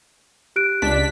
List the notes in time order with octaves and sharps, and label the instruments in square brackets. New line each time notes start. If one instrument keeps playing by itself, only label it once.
[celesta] G4 F#6 D7
[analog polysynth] C#2 D4 B6